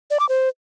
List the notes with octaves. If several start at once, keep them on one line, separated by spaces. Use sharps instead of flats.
D5
D6
C5